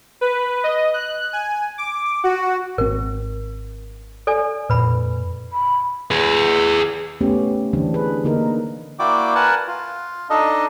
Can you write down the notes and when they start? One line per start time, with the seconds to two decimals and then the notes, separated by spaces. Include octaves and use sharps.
0.21 B4
0.64 D#5
0.94 F#6
1.33 G#5
1.78 D6
2.24 F#4
2.78 G#1 C4 A#4
4.27 A4 D5 G#5
4.70 F2 A#2 B4 B5
5.53 B5
6.11 G#4 B4
7.21 A3 B3 C#4 G4
7.73 D3 E3 G3 C4 D4
7.94 G#4 B4
8.24 D3 A#3 D#4 A#4
8.99 A#3 E4 F#4 D5 G5 D6
9.35 A#4 B4 F#5 G#5 A5
9.67 F4
10.30 D4 D#4 A4 D#5